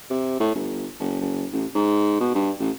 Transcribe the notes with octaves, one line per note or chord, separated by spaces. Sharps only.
C3
A2
G1
F#1
F#1
A1
G#2
B2
G2
A1